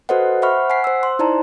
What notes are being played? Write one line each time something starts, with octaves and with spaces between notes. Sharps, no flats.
F#4 A4 B4 C5 D#5 F#5
C5 E5 F#5 B5 C#6 F6
F#5 G#5 B6 C7
C5 E6
C6
D#4 E4 C5 D5 A5 A#5